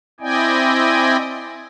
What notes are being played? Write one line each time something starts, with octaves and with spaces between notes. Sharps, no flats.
C4 E4 D5 D#5 G5 G#5